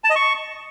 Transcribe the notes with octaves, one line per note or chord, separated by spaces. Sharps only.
A5
D#5
C#6